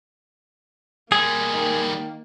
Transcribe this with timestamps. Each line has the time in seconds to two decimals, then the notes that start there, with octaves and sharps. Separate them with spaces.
1.12 G3 G#3 A#3 G#4
1.54 D#3